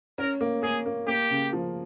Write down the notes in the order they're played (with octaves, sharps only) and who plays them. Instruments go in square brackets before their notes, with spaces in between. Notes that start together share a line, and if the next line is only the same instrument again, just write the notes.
[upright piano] C#4 [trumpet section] A#4
[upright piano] A#3
[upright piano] A#3 [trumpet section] G#4
[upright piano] A#3
[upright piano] A#3 [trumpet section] G4
[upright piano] C#3
F3